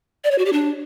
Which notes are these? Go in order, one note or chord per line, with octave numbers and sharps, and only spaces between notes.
D5
C#5
F#4
G4
D4